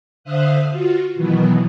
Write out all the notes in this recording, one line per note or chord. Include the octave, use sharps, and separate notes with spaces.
D3 C5 E5 F5 D#6 F#6
F4 F#4
B2 D#3 E3 F#3 B3